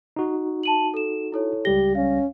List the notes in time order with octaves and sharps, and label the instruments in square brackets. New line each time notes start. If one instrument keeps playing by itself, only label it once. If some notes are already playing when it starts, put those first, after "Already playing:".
[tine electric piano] D#4 F#4
[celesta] A5 D#7 F#7
A4 E7
E4 A4 C#5
[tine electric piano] C#2 G3 A#6 [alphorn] G4 [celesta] G7
[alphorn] C#4 [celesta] F5